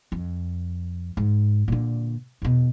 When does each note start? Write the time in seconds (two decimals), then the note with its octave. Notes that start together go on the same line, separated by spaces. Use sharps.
0.12 F2
1.17 G#2
1.68 A#2 D3
2.42 E2 B2